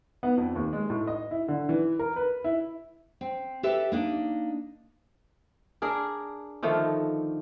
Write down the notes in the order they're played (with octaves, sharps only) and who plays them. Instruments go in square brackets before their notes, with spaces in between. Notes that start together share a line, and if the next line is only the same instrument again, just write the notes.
[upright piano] B3
F2
D#2
G#3
A2
D#5
E4
D3
E3
A#4
B4
E4
[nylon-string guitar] C4
G4 A4 B4 E5
A#3 D4 D#4
[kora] D4 G#4 A#4
D3 D#3 F3 A3